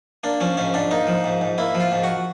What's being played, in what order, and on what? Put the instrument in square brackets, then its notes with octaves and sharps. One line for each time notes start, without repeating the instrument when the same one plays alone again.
[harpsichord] A#3 D4
F3 C#4
G#2 C#4
G#2 D4
A#3 D#4
F3
G#2
G#2
A#3 E4
F3
F4
G#2
F#4